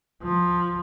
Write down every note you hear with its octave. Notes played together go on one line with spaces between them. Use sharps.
F3